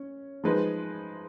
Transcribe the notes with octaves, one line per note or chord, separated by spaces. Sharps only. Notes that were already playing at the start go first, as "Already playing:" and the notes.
Already playing: C#4
F3 G#3 D#4 G#4 B4